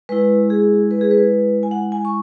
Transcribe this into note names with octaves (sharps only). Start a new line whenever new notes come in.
G#3 E4 B4
G#4
B4
G#4
B4
G#5
F#5
G#5
C#6